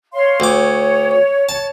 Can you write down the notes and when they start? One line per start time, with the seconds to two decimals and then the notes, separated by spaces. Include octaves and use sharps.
0.14 C#5 F5 C6
0.40 D2 C#5 D6
1.49 A5